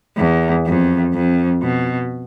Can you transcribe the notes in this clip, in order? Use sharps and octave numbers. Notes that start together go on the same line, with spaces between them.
E2
F2
F2
B2